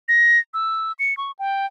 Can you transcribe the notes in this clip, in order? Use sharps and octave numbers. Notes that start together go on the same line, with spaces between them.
A#6
E6
C#7
C#6
G5